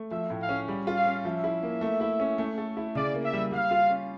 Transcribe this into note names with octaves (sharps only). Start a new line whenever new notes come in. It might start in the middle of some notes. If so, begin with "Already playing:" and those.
Already playing: A3
F3 E5
A2
F5
C#4
G3
F4
F5
C#4
F3 E5
E4
A#3
A3
E4
C#4
A3
A4
E4
C#3 D5
A#3
E5
G3
G3 F5
F4
C#4